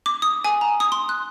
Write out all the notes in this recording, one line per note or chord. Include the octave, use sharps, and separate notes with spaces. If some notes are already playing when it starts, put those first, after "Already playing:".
D6
D#6
G#5
A#5
D#6
C6
F#6